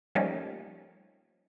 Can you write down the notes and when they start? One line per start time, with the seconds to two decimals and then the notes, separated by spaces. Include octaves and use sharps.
0.15 F3 G3 A3 A#3 C#4 D#4